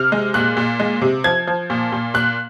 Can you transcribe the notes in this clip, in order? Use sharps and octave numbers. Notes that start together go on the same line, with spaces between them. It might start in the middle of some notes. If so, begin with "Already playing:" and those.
Already playing: C3 F6
G#3
A#2 F#6
A#2
G#3
C3
F3 G#6
F3
A#2
A#2
A#2 F#6